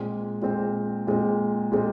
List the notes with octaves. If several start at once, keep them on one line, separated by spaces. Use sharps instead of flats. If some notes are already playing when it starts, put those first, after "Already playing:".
Already playing: A#2 G#3 C4
A#2 G#3 C4
A#2 G#3 C4
A#2 G#3 C4